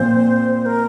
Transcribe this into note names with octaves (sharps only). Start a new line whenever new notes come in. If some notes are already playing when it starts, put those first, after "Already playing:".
Already playing: A#2 F3 C4 C5
A#4